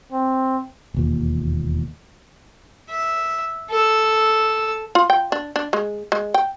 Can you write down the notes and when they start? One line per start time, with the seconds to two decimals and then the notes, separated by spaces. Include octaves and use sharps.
0.12 C4
0.94 E1 D#2 A#2
2.90 E5
3.70 A4 E6
4.95 F4
5.10 G5
5.32 D4
5.56 D4
5.73 G#3
6.12 G#3
6.34 G5